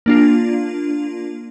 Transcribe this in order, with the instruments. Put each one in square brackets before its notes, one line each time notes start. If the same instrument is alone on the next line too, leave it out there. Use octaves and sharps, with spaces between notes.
[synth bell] A#3 D4 F4